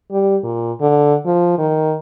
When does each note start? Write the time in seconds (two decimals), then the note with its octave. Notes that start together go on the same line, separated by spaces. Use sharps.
0.12 G3
0.43 A#2
0.81 D3
1.26 F3
1.58 D#3